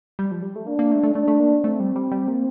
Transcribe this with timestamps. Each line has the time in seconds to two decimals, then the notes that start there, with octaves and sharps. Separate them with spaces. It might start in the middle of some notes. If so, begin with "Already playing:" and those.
0.19 G3
0.32 F3
0.42 G3
0.56 A3
0.66 A#3 D4
0.79 A#3
0.92 A3
1.03 A3
1.15 A3 D4
1.28 A3
1.39 A#3
1.63 A3 C4
1.80 G3
1.96 G3
2.12 G3
2.28 A#3